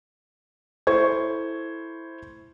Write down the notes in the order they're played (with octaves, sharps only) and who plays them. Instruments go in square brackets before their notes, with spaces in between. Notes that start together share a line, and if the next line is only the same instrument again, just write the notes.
[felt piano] A3 E4 C5 C#6 G#6